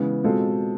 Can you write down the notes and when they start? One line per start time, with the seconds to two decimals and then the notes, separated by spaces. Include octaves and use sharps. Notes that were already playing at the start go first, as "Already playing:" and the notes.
Already playing: C#3 E3 G#3 B3
0.24 B2 G#3 C4 F4 A4